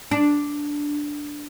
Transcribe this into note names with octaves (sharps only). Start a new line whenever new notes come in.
D4